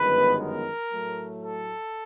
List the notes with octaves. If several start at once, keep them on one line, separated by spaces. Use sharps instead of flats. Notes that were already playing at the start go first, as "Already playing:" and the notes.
Already playing: G1 F#2 D#3 G#3 B3 B4
A#4
A2 F#3 A3
A4